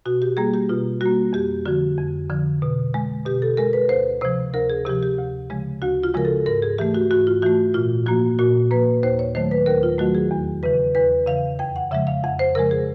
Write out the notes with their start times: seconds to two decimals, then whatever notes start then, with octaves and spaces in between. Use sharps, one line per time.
0.06 B2 F#4
0.22 G4
0.37 G3 A#3 G#4
0.54 G4
0.69 B2 F4
1.01 G3 A#3 F#4
1.33 F2 G4
1.66 D3 F3 F#4
1.98 F2
2.30 D3 F3
2.62 B2
2.94 G#3
3.26 B2 G4
3.42 A4
3.57 G#3 A#4
3.73 B4
3.89 D2 C5
4.21 C3 F3 C5
4.54 D2 A#4
4.70 G#4
4.85 C3 F3 G4
5.03 G4
5.18 D2
5.50 C#3 F3 G#3
5.82 D2 F#4
6.03 F4
6.14 C#3 F3 G#3 A#4
6.25 A4
6.46 G#2 A#4
6.62 G#4
6.78 E3 A3 G4
6.94 F#4
7.11 G#2 F#4
7.27 F4
7.42 E3 A3 F#4
7.74 A#2 F4
8.06 F3 A#3 F#4
8.39 A#2 F#4
8.71 F3 A#3 B4
9.03 D#2 C5
9.19 C#5
9.35 D#3 F#3 A3 C5
9.51 B4
9.66 D#2 A#4
9.83 F4
9.98 D#3 F#3 A3 F#4
10.15 G#4
10.31 E2
10.63 C#3 E3 B4
10.95 E2 B4
11.26 C#3 E3 F5
11.59 F2 G5
11.76 F#5
11.91 C#3 F3 G#3 E5
12.07 F5
12.23 F2 F#5
12.39 C5
12.55 C#3 F3 G#3 A#4
12.71 G#4